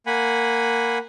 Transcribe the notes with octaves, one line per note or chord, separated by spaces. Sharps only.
A#3 F#5 G#5 B5